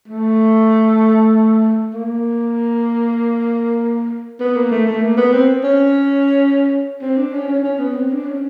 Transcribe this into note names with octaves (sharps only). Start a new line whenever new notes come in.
A3
A#3
B3
A#3
A3
A3
A#3
B3
C4
C#4
C4
D4
C#4
C#4
C#4
B3
C4
D4
C#4